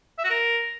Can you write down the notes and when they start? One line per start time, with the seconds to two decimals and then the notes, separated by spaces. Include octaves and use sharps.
0.18 E5
0.24 F#4
0.30 A#4